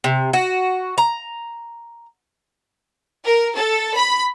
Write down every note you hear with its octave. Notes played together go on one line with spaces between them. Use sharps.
C3
F#4
A#5
A#4
A4
B5